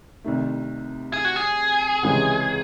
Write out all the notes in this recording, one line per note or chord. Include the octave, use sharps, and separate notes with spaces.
C2 C3 D#3 A3
G#4
F#4
G#4
C#2 C3 E3 G#3 C#4